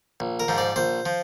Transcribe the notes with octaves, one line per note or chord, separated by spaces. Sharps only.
A#1
A#4
G#2 F3
D5
A#1 C5
F3